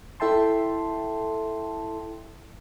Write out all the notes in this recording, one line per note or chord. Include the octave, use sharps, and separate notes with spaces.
E4 A4 E5 G5 A5 C6